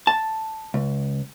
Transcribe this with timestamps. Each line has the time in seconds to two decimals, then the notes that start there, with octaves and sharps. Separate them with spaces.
0.07 A5
0.74 C#2